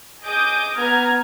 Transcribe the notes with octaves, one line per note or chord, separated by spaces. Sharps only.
G#4 D#5 D6 D#6 G6
B3 A#5 F6 G#6